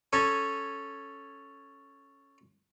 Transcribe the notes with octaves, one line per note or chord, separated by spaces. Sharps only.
C#4 A4 G#5 A#5